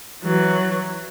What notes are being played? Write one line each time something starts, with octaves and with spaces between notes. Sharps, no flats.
E3 F#3